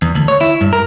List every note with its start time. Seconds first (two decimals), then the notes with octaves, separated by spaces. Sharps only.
0.02 E2
0.15 D2
0.28 C#5
0.41 E4
0.61 G2
0.73 A#4